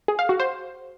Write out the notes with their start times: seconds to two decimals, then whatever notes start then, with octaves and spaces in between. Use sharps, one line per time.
0.08 G#4
0.19 F5
0.29 F#4
0.40 C5